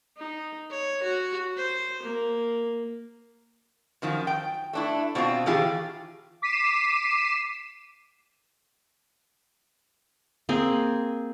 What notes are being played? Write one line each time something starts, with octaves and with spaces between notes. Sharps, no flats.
D#4
C#5
F#4
C5
A#3
F#2 D#3 F3
G5
A3 D4 E4
B2 C4 D4 F4
D#3 E3 F4 G4 G#4
D6 B6 C7 D#7 E7
A#3 C4 G#4